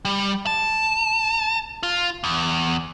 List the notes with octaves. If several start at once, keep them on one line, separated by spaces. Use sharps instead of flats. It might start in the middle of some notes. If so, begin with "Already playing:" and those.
G3
A5
F4
E2